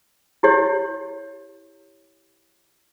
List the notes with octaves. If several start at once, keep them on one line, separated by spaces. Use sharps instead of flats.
E4 G4 C#5